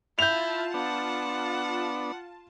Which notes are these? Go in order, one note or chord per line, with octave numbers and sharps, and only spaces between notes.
E4 F4 A5 G6 F7
B3 D4 F#5